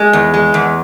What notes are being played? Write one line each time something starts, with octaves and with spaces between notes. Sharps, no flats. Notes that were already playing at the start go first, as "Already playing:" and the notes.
Already playing: G#3
E2
G#3
E2